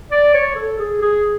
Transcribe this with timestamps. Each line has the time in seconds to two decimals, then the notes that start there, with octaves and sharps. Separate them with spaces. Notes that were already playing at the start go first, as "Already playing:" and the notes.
0.12 D5
0.34 C#5
0.55 A4
0.79 G#4
1.02 G#4